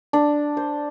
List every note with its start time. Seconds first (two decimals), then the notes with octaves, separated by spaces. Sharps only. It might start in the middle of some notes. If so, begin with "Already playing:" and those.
0.13 D4
0.57 C5